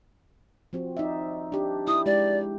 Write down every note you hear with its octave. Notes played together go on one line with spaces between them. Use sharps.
F3 C4 F#4
D#4 D5 E5
D4 G4
E4 D#6
G#3 G4 D5